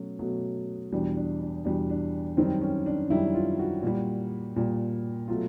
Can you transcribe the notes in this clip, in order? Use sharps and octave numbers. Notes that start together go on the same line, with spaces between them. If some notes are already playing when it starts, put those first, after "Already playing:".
Already playing: B2 F#3 A3 C#4
B2 F#3 A3
E2 B2 G3 D4
D4
D4
E2 B2 G3 D4
D4
F#2 D#3 G3 C4
C#4
D4
F#2 D#3 G3 E4
F4
F#4
A#2 G3
A#2 G3
B2 F#3 A3 F4